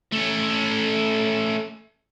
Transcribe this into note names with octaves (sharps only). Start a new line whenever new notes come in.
A3 C#4